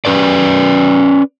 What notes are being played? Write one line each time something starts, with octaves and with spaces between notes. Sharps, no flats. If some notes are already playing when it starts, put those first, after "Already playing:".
C#4 B4 D5